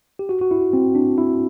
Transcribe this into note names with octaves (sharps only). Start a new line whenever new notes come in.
G4
F#4
F#4
E4
C4
D4
E4